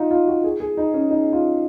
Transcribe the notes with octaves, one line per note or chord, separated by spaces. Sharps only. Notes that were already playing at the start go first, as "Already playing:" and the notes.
Already playing: D#4 F4
F4
F#4
G#4
G#4
D#4
C#4
D#4
F4